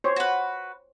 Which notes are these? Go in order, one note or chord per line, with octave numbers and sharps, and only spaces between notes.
C5 C#5
F#4 B4